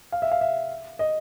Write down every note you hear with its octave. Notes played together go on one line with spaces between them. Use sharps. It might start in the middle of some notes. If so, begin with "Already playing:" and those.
F5
E5
F5
E5
D#5